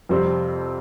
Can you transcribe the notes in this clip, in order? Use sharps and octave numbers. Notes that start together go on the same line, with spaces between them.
F2 C3 G3 C4